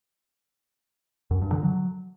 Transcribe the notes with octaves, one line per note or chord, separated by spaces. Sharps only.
F#2
G2
D3
F#3